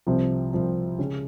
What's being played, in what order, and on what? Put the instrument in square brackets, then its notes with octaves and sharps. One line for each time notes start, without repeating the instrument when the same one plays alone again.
[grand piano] C2 C3 F3 C4
C2 C3 F3 C4
C#3 G#3 C#4